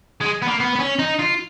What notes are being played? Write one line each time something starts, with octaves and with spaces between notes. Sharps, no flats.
G#3
B3
A#3
B3
B3
C#4
D#4
F4